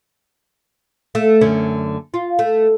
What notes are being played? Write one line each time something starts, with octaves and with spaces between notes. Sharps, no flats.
A3
F#2 D3 C#4
F4
A3